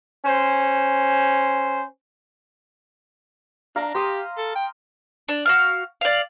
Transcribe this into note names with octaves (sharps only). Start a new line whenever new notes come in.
C#4 C5
D4 F5 A#5
G4 C6 D#6
A4
G5
D4
F#4 F5 F6
D5 F5